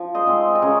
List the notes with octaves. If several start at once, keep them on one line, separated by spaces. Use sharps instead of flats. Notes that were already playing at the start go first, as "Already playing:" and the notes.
Already playing: F3
C5 D#5
G#3 C4 D#4
D#5
C#3 A#4 C#5